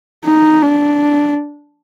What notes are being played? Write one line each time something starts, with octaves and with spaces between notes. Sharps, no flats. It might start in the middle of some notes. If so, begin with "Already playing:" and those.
D#4
D4